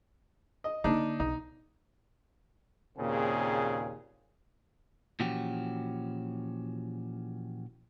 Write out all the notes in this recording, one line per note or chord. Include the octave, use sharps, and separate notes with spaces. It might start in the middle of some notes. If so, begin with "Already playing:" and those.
D#5
D3 A#3 D4 D#4
B1 D#4
D#2 A#2 C#3 C4 G#4
A#2 E3 F3 C#4 F#4 G4